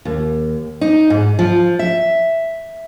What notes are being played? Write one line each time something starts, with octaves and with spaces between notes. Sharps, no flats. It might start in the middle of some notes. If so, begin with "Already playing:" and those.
D#2
D#4
G#2
F3
E5